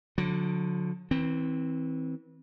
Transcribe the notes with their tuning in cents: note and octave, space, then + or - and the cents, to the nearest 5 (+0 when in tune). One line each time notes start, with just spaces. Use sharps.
D3 -15 F#3 -45
E3 -30 C4 +0